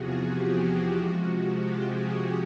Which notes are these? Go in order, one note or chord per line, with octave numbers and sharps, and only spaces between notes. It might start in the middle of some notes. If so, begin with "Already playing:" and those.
Already playing: E2 C3 F3 F#4 G#4
G4
F#4
C3 F3 G#3
G4
G#4